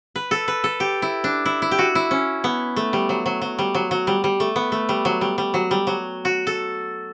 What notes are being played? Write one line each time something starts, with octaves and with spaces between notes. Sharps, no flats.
B4
A4
B4
A4
G4
E4
D4
E4
E4
G4
F#4
E4
C#4
B3
A3
G3
F#3
F#3
F#3
G3
F#3
F#3
G3
G3
A3
B3
A3
G3
F#3
G3
G3
F#3
G3
F#3
F#4
A4